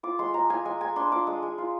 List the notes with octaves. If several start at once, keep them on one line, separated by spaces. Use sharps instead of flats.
F4 D6
G#3 C6
G#3 A#5
F4 G#5
G#3 G#5
G#3 G#5
D4 C6
F4 D6
G#3 D#6
G#3
F4